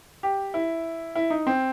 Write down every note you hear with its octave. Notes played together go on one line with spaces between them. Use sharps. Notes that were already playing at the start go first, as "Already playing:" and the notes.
G4
E4
E4
D#4
C4